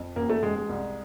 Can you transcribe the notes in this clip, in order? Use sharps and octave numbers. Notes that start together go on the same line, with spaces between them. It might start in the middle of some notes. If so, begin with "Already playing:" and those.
Already playing: F2
A1 A#3
A3
A1 G#3
G#3
C2